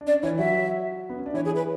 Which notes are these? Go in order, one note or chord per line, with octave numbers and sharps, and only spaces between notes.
D4
C#4 D5
E3 E4 C#5
F#3 F#4 E5
B3
C#4
D4
E3 E4 C#5
G#4
B4